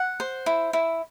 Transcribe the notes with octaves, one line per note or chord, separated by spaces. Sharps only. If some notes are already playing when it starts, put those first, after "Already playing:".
Already playing: F#5
C5
E4
E4